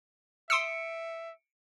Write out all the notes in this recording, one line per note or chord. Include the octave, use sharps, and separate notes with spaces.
E5 C6 D#6 E6 C#7 D7